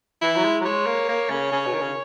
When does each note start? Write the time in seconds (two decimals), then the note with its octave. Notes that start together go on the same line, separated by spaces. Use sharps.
0.22 E3 E4
0.36 F#3
0.44 G#3
0.61 F#3
0.65 G#3 C#5
0.86 A#3
1.08 A#3
1.30 C#3
1.51 C#3
1.66 B2
1.73 D#3
1.81 C#3